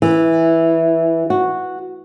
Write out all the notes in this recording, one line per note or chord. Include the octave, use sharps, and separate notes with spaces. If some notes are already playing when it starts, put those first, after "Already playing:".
E3
F#4